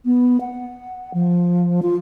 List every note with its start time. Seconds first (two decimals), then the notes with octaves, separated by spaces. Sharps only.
0.05 B3
0.41 F#5
1.14 F3
1.83 F4